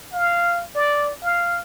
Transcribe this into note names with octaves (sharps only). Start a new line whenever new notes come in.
F5
D5
F5